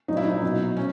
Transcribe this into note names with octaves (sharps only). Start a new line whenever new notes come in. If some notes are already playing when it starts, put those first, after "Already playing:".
A#2 F#3 D#4
E4
D#4
B2 F#3
C#4